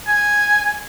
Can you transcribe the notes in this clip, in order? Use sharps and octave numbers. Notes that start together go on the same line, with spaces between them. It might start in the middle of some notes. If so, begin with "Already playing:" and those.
G#5